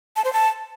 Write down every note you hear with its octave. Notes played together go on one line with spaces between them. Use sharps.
A5
C5
A5